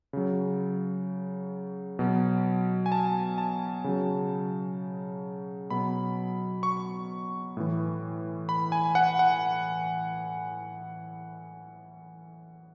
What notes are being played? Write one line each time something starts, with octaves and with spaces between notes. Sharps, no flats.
C#3 F#3
B2 F#3
G#5
A5
A5
C#3 F#3
B2 F#3 B5
C#6
A2 E3
B5
G#5
F#5
F#5